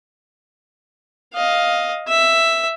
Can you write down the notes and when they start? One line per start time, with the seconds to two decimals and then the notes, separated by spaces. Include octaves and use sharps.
1.34 D#5 F5
2.08 E5